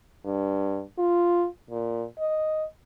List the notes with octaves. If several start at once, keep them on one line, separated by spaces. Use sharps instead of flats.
G2
F4
A#2
D#5